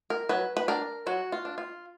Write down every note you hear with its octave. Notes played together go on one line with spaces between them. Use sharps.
A#4
F#3 B4
B4
D4 A#4
F#3 F#4
F4
D4
F4